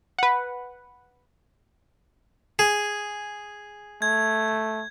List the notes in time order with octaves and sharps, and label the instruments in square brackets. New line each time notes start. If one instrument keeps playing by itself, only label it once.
[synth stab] B4 F#5
[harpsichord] G#4
[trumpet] A3 [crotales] G#6